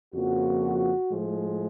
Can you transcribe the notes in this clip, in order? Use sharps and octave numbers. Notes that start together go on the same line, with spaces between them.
F2 C#3 F3 A#3 F#4
A2 F3 G#3